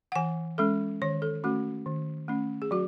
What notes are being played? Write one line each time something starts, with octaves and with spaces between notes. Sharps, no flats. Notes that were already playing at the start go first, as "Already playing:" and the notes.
F#5
E3 G#5
G#3 C#4 A4
D#3 C#5
A4
A3 C#4 F#4
D#3
A3 C#4
G#4
F#3 F#4